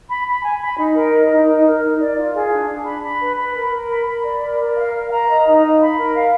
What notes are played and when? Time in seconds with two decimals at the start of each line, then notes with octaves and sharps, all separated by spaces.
0.09 B5
0.26 B5
0.43 G#5
0.61 B5
0.77 D#4
0.95 A#4
1.12 D#5
1.30 D#4
1.47 D#4
1.64 A#4
1.82 D#4
1.99 D5
2.16 F4
2.33 G#4
2.50 D4
2.68 D4
2.85 B5
3.03 B5
3.20 B4
3.37 B5
3.55 A#4
3.72 A#4
3.89 B5
4.06 B5
4.23 D5
4.41 A#4
4.58 A#4
4.75 F5
4.93 A#4
5.10 A#5
5.27 D#5
5.45 D#4
5.62 F5
5.79 B5
5.96 A#4
6.14 F5